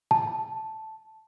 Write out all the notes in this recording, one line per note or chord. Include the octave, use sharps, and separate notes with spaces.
A5